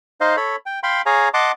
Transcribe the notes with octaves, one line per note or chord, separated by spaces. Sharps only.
D#4 C5 D#5 F5
A4 C#5 B5
G5
F5 G5 B5 C6
G#4 C#5 F5 G#5 A#5
D#5 F#5 A5 C6 D6